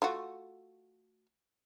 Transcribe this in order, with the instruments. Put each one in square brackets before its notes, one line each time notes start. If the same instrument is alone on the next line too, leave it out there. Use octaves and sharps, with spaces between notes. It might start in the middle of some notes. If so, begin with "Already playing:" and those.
[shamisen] A3 F4 F#4